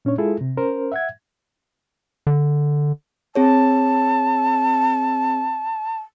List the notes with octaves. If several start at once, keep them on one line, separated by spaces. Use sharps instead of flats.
A#2 C#4 D4 C#5
G#3 E4 F4 G#4 A4
C3
C#4 A#4 C5
E5 F#5 G#6
D3
C4 G#4 C#5 A5